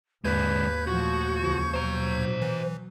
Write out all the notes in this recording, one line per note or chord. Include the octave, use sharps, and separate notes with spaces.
D#2 G#2 D3 G#3 B4 G6 G#6
A#2 F3 A3 F#4 C#6
C#2 F3
B2 F#3 C5 A#5
E3